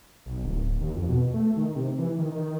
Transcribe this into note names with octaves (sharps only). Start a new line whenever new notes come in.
B1
D1
D#2
F2
B2
A3
D#3
C3
E3
D#3
D#3